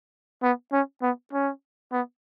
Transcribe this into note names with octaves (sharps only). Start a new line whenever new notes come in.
B3
C#4
B3
C#4
B3